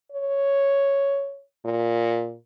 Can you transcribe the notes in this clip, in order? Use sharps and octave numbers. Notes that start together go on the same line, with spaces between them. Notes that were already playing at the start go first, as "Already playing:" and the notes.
C#5
A#2